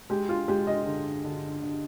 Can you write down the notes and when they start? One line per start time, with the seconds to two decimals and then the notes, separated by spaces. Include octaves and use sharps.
0.10 G#3 G4
0.29 F4
0.48 G#3 G4
0.67 D#5
0.85 D3
1.24 D3
1.62 D3